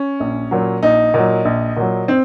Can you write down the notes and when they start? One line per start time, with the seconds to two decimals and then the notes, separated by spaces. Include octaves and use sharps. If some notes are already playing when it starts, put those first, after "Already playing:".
Already playing: C#4
0.20 A#1
0.51 A#2 F#3
0.82 A#1 D#4
1.14 A#2 F#3
1.45 A#1
1.77 A#2 F#3
2.08 C4